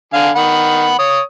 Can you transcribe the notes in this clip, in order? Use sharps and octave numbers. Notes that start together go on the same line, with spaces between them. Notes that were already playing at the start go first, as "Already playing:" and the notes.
D3 F5 G#5
D#3 F#5 B5
C#5 D#6